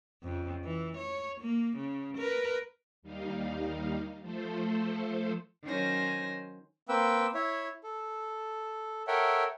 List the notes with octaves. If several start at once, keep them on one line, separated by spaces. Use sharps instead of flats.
F2 C#3
E3
C#5
A#3
C#3
A#4 B4
D#2 G3 D#4 F5
F3 A3 A4 C5
D#3 F#3 C#4 C5 G#5 A#6
A#3 C4 B4 G5 E6
E4 C#5 E5
A4
A4 A#4 C#5 E5 F#5 G5